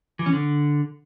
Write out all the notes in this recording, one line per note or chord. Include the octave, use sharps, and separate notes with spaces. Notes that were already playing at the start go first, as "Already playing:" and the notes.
E3
C#4
D3